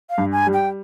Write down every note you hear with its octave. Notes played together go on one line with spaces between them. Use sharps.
F5
G2
G#5
G3
G5